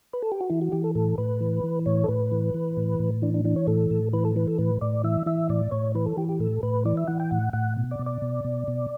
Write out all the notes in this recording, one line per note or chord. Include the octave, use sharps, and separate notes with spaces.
B4
A4
G4
F#4
E3 E4
F#4
E3 G4
A4
A2 A4
A2 B4
E3
E3
A2 C#5
A4
A2 B4
E3
E3
A2
A2
E3 D4
D4
E3 D4
C#5
A2 A4
A2
E3 B4
A4
E3 B4
A4
A2 B4
A2 D5
E3 E5
E3 E5
A2 D5
A2 C#5
E3 B4
A4
E3 G4
G4
A2 A4
A2 B4
E3 D5
E5
E3 F#5
G5
A2 F#5
A2 F#5
B2
D5
B2
D5
B2
B2
B2